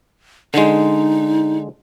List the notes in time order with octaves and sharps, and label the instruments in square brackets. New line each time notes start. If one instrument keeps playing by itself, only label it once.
[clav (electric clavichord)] D3 G#3 [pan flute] D#4